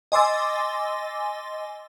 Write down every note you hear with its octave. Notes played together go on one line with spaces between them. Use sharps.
D#5 G#5 C6 D6 E6 A6